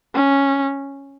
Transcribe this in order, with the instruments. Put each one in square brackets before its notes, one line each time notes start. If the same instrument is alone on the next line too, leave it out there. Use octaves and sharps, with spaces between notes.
[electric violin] C#4